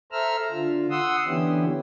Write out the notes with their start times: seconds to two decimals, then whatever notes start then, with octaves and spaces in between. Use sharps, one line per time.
0.12 A4 C5 E5 A#5 E6 F6
0.51 D3 F4
0.90 F#5 C6 D#6 E6
1.27 D3 E3 B3 C#4 E4 G4